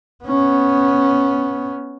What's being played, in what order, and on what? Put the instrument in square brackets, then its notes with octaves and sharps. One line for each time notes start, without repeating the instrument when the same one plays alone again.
[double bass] B3 C#4